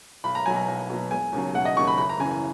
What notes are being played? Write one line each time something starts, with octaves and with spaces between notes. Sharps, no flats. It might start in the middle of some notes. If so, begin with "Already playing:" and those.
B1 B5
A#5
B2 F#3 G#5
A#5
B1
B2 F#3
E1 G#5
D#2 C#3 F#3
E1 F#5
D#5
D#2 C#3 F#3 C#6
B5
F#1 B5
A#5
F#2 C#3 E3 G#5
G#5